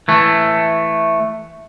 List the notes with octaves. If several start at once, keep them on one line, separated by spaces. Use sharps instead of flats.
E3 A3